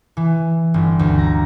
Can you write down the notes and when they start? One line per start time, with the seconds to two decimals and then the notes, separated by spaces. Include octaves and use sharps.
0.17 E3
0.74 G1
0.99 D2
1.18 A#5